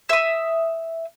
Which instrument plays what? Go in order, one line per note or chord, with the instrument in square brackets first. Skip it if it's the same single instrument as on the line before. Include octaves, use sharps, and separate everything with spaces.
[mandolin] E5 D#6